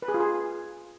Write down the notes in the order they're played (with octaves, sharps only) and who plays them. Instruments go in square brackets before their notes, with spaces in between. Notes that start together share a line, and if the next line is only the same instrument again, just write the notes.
[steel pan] B4
G#4
F4
G#4